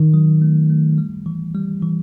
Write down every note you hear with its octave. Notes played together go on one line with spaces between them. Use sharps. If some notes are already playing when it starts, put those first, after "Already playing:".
Already playing: D#3
F#3
A3
A3
G3
E3
G3
E3